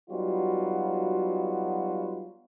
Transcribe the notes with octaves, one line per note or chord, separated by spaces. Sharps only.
F#3 G3 B3 D#4 F4 F#4